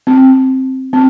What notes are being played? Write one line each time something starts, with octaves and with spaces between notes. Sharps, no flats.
C4
C4